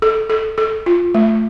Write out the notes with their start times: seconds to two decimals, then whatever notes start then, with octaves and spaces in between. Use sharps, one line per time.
0.02 A4
0.30 A4
0.58 A4
0.86 F4
1.15 A3